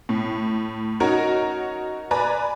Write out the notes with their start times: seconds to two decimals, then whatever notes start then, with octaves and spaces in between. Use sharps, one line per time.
0.09 A2
1.00 C#4 D#4 F#4 A#4 C#5 D#5
2.11 B4 D5 G#5 A#5 B5